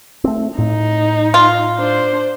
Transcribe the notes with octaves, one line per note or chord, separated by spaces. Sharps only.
A3 C4
A2 D#4
F4
D4 C5